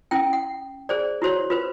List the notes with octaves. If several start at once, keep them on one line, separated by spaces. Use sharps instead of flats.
C#4 E4 G5
F#5
G#4 C5 D5
E4 F#4 C5 C#5
F4 B4 C5